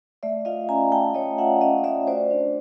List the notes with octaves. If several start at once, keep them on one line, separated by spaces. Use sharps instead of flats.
A3 D5 E5
F4 D#5 F5
C#4 G#5 A#5
A3 G5 A5
A3 C#5 D#5
F4 E5 F#5
C#4 D#5 F5
A3 D5 E5
F#4 C5 D5
D4